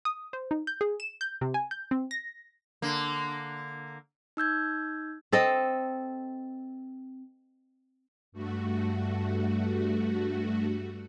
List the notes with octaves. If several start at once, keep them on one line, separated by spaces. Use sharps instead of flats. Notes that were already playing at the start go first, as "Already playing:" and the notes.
D#6
C5
D#4
G6
G#4
E7
G6
C3
G#5
G6
C4
A#6
D3 A#3
D#4 E6 G6 G#6
C4 A4 D#5
G2 A3 F#4